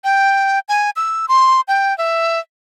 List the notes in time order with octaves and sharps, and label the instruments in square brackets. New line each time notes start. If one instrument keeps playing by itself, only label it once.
[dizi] G5
G#5
E6
C6
G5
E5